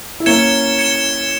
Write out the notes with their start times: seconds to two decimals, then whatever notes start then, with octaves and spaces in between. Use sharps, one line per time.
0.20 E4
0.26 A#3 C#4 G#6 C#7 E7 G7
0.78 G#6 C#7 E7 G7